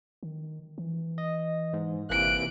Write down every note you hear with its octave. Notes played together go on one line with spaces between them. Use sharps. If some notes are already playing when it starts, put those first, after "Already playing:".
D#3
E3
D#5
G#2
G1 C3 E3 A#3 F#6 D7